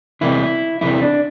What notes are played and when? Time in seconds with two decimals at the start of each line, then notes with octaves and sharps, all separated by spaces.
0.21 E2 C3 E3 E4
0.81 E2 C3 E3 E4
1.02 D4